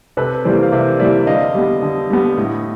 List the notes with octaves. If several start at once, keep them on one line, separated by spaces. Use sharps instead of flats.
C3 A4 B4
E3 G3 A#3 C5 D5
F5
C3 D5 E5
E3 G3 A#3 D5 E5
D3 D#5 F5
G3 B3
D3
G3 B3
A2